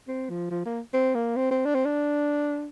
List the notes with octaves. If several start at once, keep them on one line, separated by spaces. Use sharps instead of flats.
C4
F3
F3
A#3
C4
A#3
C4
C4
D4
C4
D4